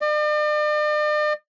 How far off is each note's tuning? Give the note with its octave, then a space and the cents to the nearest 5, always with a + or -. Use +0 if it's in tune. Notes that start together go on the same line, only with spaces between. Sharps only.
D5 +45